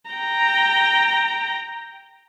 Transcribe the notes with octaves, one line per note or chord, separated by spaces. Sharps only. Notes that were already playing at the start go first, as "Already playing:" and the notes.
G5 A#5